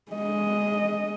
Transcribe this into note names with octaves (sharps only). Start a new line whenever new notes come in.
G#3 D#5